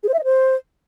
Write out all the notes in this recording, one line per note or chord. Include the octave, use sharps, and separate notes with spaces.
G#4
C5
E5
D#5
C5